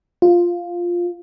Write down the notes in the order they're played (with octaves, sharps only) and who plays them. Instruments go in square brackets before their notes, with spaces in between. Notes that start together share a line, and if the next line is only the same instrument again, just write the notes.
[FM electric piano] F4